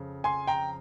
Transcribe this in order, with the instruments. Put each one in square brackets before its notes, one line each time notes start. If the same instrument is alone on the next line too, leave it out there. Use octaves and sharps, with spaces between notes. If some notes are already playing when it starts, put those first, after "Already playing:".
Already playing: [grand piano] F2 C#3
G#5 C6
G5 A#5